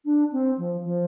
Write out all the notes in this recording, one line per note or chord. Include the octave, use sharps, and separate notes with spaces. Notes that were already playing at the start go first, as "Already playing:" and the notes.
D4
C4
F3
F3